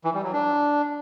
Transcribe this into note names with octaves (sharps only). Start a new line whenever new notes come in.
E3
G3
F#3
D4